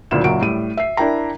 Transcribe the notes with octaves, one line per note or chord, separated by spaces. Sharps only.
F#1 D2 A#2 E4 E5 E7
F#1 A#2 F#3 D7
A2 G3 D#7
E5 C7
D4 E4 A#4 G5 A#5